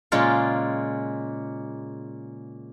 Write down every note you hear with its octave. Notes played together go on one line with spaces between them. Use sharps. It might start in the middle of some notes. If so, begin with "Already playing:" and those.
A#2 C#3 G#3 F4